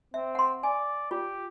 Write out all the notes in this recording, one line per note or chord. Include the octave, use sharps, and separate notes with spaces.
C4 E5
F#5 C6
D5 G#5
F4 G4